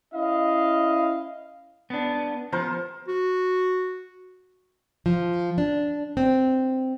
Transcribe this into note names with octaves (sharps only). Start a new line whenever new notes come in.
C#4 E4 D#5 F5
B3 D4
F3 B3 A#4 C5
F#4
F3
D4
C4